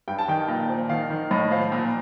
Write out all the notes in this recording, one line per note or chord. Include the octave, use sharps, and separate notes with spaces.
G2 G5
A5
D#3 G5
A#2
F3
D#3 F5
D#3
A2 D#5
F3 F5
A#2